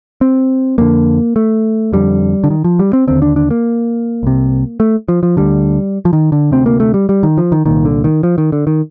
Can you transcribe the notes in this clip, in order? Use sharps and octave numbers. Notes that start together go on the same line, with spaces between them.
C4
F2 D3 A#3
A3
F2 D3 G3
D3
D#3
F3
G3
C4
D#2 D3 C4
D4
D4
A#3
C2 C3
A3
F3
F3
D2 D3 G3
F3
D#3
D3
D2 C3 C4
A#3
A3
G3
G3
D#3
F3
D#3
C2 A#2 D#3
D3
D#3
F3
D#3
D3
D#3